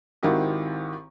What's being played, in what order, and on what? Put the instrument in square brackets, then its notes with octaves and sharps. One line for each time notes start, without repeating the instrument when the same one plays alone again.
[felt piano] G#1 D#3 C4 E4 F#4 G4